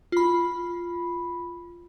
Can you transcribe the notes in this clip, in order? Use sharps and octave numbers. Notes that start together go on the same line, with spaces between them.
F4 B5